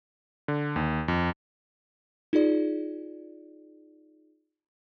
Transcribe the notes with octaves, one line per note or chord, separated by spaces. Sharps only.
D3
D#2
F2
D#4 F4 G#4 D5